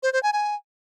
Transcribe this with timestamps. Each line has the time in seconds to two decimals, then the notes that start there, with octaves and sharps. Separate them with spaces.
0.03 C5
0.13 C5
0.23 G#5
0.33 G#5